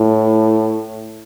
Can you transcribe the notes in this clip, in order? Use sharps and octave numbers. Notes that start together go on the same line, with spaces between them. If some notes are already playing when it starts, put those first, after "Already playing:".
Already playing: A2